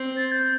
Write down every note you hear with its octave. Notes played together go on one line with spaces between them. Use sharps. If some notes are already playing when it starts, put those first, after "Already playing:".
Already playing: C4
A6
G6